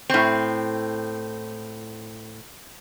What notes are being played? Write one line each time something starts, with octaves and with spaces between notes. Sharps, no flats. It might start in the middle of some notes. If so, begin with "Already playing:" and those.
A2 C4